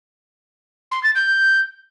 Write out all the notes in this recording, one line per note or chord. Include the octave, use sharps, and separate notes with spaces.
C6
A6
G6